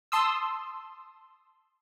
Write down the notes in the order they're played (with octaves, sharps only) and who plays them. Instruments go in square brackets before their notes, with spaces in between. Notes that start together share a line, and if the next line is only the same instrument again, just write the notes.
[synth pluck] A5 C6 D#6 E6